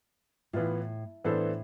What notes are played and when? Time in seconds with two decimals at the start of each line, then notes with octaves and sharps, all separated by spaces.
0.53 A2 E3 B3 F4
1.24 A2 E3 B3 D4 A4 C5